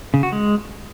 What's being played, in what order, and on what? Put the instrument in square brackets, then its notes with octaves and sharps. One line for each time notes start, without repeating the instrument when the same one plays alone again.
[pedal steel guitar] C#3
F#4
G#3